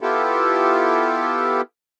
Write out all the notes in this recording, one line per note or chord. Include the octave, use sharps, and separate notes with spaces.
B3 E4 F4 G4 A4